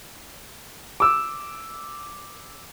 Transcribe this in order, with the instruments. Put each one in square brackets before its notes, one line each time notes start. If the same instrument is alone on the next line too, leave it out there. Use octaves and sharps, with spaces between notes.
[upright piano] D6 E6